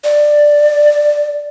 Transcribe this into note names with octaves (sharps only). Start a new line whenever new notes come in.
D5